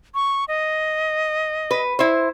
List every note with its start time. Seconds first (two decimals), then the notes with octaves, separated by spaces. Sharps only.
0.15 C#6
0.48 D#5
1.71 B4
1.99 E4 C5